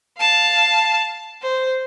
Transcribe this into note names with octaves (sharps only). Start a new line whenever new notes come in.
F5 A5
C5